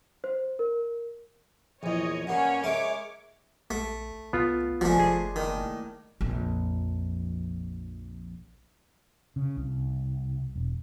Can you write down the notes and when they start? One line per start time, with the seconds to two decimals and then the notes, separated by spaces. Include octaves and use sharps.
0.24 C5
0.59 A#4
1.83 A#1 E2 C#5 D#5
2.27 G2 A#3 C#4 C#5 F#5
2.64 G#3 A#4 C#5 E5 D6
3.71 A#1 A3
4.33 C2 B3 F4
4.81 G1 F3 G#3 A3 D4 A#4
5.00 F#1 G#4
5.36 A2 D#3 A#3
6.21 A#1 F2
9.36 C#3
9.57 C2
10.56 E1